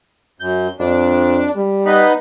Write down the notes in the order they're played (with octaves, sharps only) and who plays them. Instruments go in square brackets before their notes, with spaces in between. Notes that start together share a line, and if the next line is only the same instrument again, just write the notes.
[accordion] F#2 G6
[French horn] F2 [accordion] D4
[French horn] G3
[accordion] B3 D#4 B4